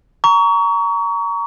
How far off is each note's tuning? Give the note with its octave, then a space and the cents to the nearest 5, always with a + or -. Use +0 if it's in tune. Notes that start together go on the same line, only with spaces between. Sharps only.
A#5 +0 C#6 +30